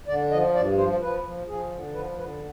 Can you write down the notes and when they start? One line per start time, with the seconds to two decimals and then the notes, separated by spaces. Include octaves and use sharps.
0.08 D3 D5
0.31 F3 D#5
0.54 G2 D5
0.78 F3 C5
1.01 F3 B4
1.24 F3
1.47 F3 G#4
1.71 D3
1.94 F3 B4
2.17 D3 B4